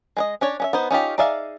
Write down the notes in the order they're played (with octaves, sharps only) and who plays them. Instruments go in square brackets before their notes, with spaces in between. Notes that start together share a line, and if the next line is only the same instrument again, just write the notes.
[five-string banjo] G#3 B4 D#5
C#4 D4 C#5
C#4 D4 E5
B3 D#4 C5
C#4 D#4 F4 G4
D#4 G#4 D5 E5 F5